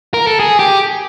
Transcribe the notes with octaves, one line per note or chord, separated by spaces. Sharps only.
A#4
A4
G#4
G4